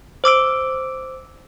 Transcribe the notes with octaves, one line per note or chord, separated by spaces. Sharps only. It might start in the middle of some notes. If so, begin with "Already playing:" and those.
C5 D6 E6 D7